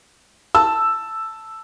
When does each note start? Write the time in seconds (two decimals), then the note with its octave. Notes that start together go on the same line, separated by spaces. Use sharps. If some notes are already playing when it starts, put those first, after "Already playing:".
0.55 A5 E6